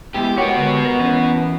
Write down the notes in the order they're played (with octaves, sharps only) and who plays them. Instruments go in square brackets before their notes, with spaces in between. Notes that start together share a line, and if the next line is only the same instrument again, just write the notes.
[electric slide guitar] G#3 B3 E4 [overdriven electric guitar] G4
[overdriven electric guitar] B3 F#4 [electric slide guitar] A#4 C#5
[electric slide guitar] D3 G#3 G4
A#4
E3 C#4 B4